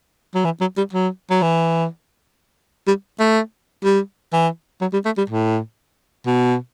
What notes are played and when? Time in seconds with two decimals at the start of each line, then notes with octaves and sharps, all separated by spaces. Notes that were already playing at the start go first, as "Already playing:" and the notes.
0.35 F#3
0.45 E3
0.61 F#3
0.77 G3
0.93 F#3
1.30 F#3
1.42 E3
2.87 G3
3.20 A3
3.84 G3
4.33 E3
4.81 F#3
4.93 G3
5.05 A3
5.18 G3
5.30 A2
6.27 B2